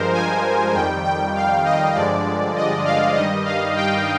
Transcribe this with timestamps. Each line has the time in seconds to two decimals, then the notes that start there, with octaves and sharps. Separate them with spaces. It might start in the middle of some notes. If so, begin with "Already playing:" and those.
Already playing: G2 F3 G#3 A#4 C5
0.14 G#5
0.74 F2 D#3 G3 G5
1.04 G5
1.35 F5
1.65 D#5
1.95 G2 D3 F3 G#3 D5
2.56 D#5
2.85 F5
3.16 G2 D#3 G3 D#5
3.45 F5
3.76 G5